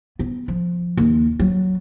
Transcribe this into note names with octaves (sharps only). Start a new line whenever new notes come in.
B3
F3
D#2
F#3